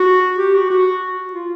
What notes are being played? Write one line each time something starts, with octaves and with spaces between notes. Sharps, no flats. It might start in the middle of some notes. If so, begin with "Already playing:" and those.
Already playing: F#4
G4
F#4
F#4
F4